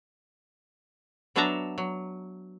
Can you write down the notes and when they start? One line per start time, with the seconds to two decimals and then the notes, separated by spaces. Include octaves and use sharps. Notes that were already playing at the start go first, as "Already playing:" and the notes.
1.36 F#3 B3 D4 E5 A5 A#5
1.78 F#3